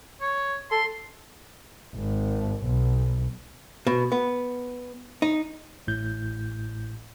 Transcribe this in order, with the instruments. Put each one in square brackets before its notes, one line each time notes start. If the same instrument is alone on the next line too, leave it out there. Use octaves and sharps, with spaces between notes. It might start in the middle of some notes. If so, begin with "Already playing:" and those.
[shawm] C#5
[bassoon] A4 [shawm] C6
[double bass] G#1
B1
[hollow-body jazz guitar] B2
B3
D#4
[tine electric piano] A1 A2 G6